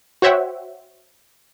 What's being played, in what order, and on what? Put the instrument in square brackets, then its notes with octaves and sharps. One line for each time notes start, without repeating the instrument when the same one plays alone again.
[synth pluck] F#4 C5 C#5 E5 F#5 G5